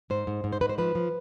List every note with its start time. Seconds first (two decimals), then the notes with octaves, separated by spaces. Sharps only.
0.10 G#2 C5
0.27 G#2
0.44 G#2
0.53 C5
0.61 G#2 B4
0.69 C5
0.78 F3 B4
0.95 F3